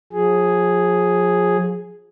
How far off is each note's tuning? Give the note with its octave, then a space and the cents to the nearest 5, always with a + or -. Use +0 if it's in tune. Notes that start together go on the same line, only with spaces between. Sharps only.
F3 +40 G#4 +0